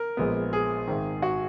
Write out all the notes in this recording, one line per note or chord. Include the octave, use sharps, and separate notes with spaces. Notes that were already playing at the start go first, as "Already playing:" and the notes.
Already playing: A#4
A#1 A#2 G#3 B3
G#4
G#1 G#2 D#3
F#4